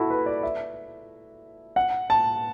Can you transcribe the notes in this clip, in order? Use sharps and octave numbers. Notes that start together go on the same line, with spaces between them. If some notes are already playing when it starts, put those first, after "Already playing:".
Already playing: E4 F#4 A4
B4
D5
E5
F#5
A5